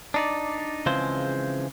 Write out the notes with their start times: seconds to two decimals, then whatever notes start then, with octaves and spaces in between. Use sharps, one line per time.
0.14 D4 D#4 D5
0.86 C#3 E3 F3 G#3 C4 C5